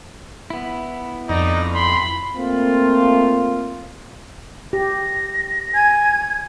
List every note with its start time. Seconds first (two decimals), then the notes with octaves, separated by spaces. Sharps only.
0.50 B3 E4
1.29 F2 D#4 D5 A#6
1.74 B5 C6
2.37 A3 A#3 C4 F4
4.73 G4 A#6
5.74 G#5 G#6